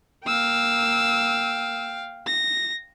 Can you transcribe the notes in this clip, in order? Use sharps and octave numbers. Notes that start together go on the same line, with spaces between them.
A#3 F5 G5 E6
A#6